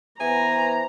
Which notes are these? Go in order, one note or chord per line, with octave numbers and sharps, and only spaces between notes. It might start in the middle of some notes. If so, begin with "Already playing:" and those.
E3 B3 C5 G#5 A#5